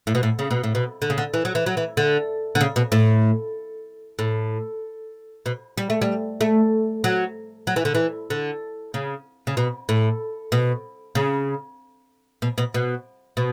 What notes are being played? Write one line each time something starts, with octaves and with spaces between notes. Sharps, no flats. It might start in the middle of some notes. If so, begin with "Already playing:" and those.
A2
B2
A2
C#3
B2
A2
B2
D3
C#3
D3
E3
F#3
E3
F#3
E3
D3
D3
C#3
B2
A2
A2
B2
G3
A3
G3
A3
F#3
F#3
E3
D3
E3
D3
C#3
C#3
B2
A2
B2
C#3
B2
B2
B2
B2